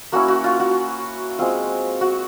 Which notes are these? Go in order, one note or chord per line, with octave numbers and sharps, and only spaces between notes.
A#3 C#4 E4 F#4
F#4
F4
F#4
G#3 C4 F4
F#4